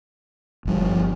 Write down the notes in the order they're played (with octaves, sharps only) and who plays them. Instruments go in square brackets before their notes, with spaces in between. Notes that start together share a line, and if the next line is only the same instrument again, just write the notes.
[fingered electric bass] G1 G2 F3